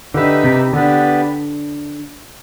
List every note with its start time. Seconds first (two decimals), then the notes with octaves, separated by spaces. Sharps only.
0.14 D3 D#4 G4 B4 E5
0.44 C3
0.73 D3 B3 D4 G4 B4